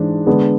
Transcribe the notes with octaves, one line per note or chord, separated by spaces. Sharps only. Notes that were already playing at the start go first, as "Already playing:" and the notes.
Already playing: G#2 E3 G#3 D4
D3 G#3 B3 D4